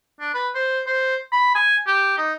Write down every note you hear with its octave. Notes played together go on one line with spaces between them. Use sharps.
D4
B4
C5
C5
B5
G#5
G4
D#4